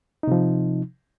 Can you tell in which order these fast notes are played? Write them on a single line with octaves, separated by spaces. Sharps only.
D#4 C3 F3